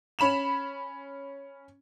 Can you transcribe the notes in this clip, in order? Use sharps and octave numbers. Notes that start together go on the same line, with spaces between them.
C#4 B5 E7 F7